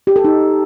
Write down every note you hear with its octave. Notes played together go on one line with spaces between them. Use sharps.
G4
A4
D#4